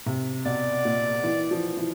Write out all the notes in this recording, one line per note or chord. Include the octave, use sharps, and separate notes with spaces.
C3
B2 D5
A#2
E3
F3
E3